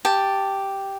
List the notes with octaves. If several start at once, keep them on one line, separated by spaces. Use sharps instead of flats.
G4 A5